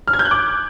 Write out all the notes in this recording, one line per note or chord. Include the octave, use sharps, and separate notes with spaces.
F6
G#6
G6
F#6
D6